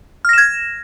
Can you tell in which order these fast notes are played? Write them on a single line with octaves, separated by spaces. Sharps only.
F6 A#6 E7 G#6